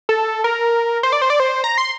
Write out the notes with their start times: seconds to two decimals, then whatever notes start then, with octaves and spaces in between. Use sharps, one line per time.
0.09 A4
0.44 A#4
1.03 C5
1.13 D5
1.22 C5
1.30 D5
1.40 C5
1.64 A#5
1.78 C6